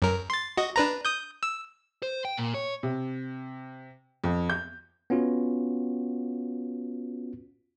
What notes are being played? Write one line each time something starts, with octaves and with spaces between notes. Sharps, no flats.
F#2 A#4
C6 A6
F#4 D#5
D4 B4 A#5
D#6 G6
E6
C5
G5
A#2
C#5
C3
F2
G6
B3 C#4 F4 F#4